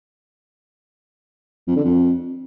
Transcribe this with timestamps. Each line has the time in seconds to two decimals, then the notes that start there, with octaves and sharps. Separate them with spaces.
1.67 F2
1.76 D3
1.84 F2